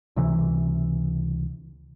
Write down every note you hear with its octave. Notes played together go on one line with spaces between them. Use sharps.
C#2 C3 E3